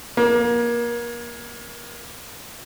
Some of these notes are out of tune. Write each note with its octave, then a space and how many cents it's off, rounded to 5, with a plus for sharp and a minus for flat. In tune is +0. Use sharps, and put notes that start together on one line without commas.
A#3 +30